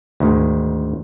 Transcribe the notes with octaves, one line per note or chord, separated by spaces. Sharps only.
D2 G#2 D#3